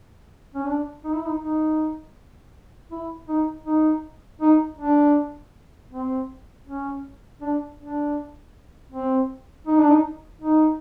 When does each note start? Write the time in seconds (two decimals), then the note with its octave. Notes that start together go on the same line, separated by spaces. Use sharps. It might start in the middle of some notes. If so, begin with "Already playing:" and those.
0.54 C#4
0.66 D4
1.04 D#4
1.15 E4
1.26 D#4
1.41 D#4
2.91 E4
3.28 D#4
3.66 D#4
4.41 D#4
4.79 D4
5.91 C4
6.67 C#4
7.41 D4
7.79 D4
8.92 C4
9.67 D#4
9.79 D4
9.90 D#4
10.42 D#4